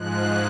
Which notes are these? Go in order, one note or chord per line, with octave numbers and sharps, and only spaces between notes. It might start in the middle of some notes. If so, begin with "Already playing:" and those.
Already playing: G#2 F3 G#3 F#6